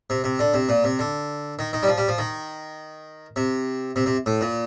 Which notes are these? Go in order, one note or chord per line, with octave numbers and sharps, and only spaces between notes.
C3
C3
D3
C3
A#2
C3
D3
D#3
D#3
G3
F3
G3
F3
D#3
C3
C3
C3
A2
A#2